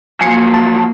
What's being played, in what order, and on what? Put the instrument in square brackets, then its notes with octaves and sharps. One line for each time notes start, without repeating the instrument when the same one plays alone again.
[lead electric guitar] F3 F#3 [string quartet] A#3 [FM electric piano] G#5 C7 C#7
[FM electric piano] A5